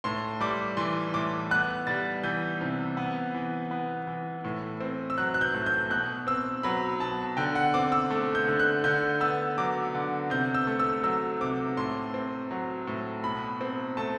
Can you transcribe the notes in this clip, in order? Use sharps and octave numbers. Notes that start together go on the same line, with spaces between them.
A2 C6
G3 D6
E3 C6
A2 D6
B3 F#6
G3 A6
E3 G6
C3
B3
E3
B3
E3
A2
C4
E6
F#3 F#6
F#6
G6
A2
G6
B2 F#6
C4 E6
F#3 B5
B2 A5
D3 G5
F#5
C4 D6
E6
A3
G6
D3
F#6
D3 G6
B3 E6
F#3 D6
D3
C3 G6
E6
A3
E6
F#3 E6
C3 D6
A2 C6
C4
F#3
A2
B2 B5
C4
A3 A5